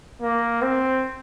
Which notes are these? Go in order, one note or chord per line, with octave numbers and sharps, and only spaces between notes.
A#3
C4